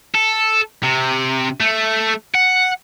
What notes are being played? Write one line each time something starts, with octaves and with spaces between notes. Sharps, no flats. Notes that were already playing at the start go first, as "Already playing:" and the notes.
A4
C3
A3
F#5